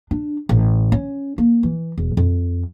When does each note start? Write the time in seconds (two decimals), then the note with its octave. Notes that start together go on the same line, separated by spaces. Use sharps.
0.11 D4
0.49 A1
0.92 C#4
1.38 A#3
1.63 E3
1.98 E1
2.17 F2